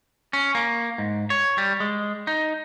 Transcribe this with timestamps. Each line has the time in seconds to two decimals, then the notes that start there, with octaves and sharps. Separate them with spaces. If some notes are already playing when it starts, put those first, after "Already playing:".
0.33 C#4
0.55 A#3
0.98 G#2
1.30 C#5
1.58 G3
1.80 G#3
2.27 D#4